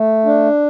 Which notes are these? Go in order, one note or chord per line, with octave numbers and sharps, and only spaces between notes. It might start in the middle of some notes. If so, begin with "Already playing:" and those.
Already playing: A3
D4